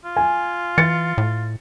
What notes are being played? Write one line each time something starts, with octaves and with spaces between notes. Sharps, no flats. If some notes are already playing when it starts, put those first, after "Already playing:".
F4
G#5
E3 A6 C#7
A2